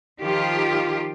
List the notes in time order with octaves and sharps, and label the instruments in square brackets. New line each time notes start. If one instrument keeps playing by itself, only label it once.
[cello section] D#3 F3 F4 G4